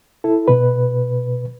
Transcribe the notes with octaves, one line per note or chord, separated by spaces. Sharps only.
E4 A4
B2 B4